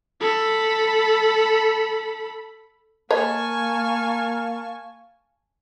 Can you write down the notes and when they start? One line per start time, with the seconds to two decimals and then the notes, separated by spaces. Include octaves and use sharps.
0.21 A4 B5
3.11 A#3 C#5 D#5 F5 G#5 A5 C#6